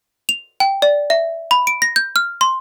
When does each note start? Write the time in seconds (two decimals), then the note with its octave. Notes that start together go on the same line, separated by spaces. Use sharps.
0.29 F7
0.60 G5
0.82 D5
1.10 E5
1.51 B5
1.67 D7
1.82 A#6
1.96 G6
2.16 F6
2.41 C6